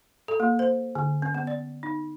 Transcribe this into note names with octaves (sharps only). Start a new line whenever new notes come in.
A4
A#3
C5
D3
C#4
B3
D5
D#4